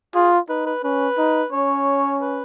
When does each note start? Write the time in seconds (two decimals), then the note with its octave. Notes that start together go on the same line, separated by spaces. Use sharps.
0.14 F4 G#4
0.49 D#4 B4
0.66 B4
0.84 C#4 B4
1.18 D#4
1.52 C#4 C#5
2.21 B4